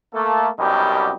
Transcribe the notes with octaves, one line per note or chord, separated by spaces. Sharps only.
A3 A#3 A4
C2 F#2 B2 G3 D#4 G4